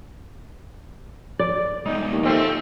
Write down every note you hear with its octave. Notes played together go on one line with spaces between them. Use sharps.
D5
G#3 B3 D#4
D#2
A3 C4 F4 D#5 E5